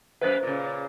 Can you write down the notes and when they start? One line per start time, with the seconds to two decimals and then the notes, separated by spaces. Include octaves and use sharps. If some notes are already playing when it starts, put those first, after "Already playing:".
0.21 F#2 A#3 B4 C5 D#5 E5
0.43 A#2 C#3